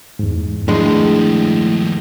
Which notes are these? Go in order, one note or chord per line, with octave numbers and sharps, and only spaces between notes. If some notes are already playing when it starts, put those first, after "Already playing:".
E2 G#2
D#2 A2 F3 G#3 D4